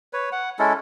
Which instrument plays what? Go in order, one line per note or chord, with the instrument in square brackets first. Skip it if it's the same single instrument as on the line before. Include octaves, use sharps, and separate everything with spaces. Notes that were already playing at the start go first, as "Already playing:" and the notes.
[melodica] B4 C#5
F#5
G#3 C#4 E4 A4